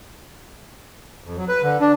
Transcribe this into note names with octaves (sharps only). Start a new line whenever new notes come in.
F2
F#3
B4
D3
D4